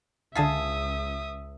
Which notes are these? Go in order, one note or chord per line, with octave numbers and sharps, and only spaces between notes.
C#2 D3 F4 G#4 E5 A5 D#6 B6